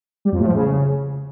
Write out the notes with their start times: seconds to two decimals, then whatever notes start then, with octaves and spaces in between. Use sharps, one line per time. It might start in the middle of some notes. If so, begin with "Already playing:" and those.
0.25 G3
0.32 F2
0.39 A2
0.47 F3
0.54 C#3